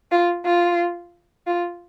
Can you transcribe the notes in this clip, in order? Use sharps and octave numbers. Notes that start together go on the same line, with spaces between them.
F4
F4
F4